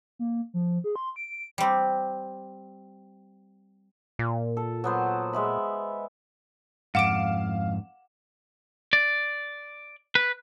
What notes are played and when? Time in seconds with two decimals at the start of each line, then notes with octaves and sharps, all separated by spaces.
0.19 A#3
0.54 F3
0.84 G#4
0.96 C6
1.16 D7
1.58 G3 C4
4.19 A#2
4.57 A4
4.84 F#3 B3 C5
5.33 G#3 E5 B5
6.95 F2 G#2 F5 F#5 D6 D7 E7
8.93 D5
10.15 B4